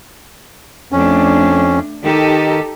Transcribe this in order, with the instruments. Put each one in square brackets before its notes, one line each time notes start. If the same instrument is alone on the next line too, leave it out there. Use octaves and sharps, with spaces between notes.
[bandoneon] F2 C#4 [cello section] A3 D4
[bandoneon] D#3 [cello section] D#4 G4 A4